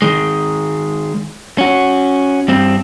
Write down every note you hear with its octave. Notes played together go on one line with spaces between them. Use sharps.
D#3 G#3
C#4 F#4
G2 C4